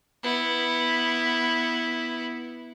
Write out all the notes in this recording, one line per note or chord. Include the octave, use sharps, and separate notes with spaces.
B3 E4